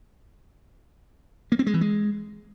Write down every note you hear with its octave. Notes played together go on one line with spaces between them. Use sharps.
A#3
C4
G#3
E3
G#3